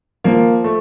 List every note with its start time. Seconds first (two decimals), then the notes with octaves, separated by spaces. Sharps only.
0.24 F3 A#3
0.64 A3